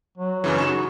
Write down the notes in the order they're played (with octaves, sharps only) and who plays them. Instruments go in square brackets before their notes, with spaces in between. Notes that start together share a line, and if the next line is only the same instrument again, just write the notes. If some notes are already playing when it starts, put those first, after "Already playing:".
[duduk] F#3
[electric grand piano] F#2 C#3 E3
[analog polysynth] D#4 F#4 [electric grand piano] C#6 E7